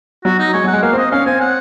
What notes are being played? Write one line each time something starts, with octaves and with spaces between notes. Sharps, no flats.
F#3 F#4
D#4
G#3 C#5
F#3
F#5
G#3
A#3 F5
C4
D#5
C#4 F5
C4 G#5
F#5